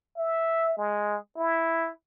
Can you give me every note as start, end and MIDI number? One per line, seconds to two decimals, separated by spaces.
0.17 0.77 76
0.77 1.17 56
1.37 1.90 64